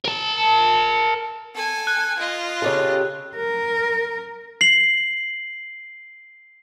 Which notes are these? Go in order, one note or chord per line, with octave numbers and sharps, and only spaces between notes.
A#4 A5
A4 G#5
F#6
F4 D#5
C#3 G4 A4
A#4
C7 F#7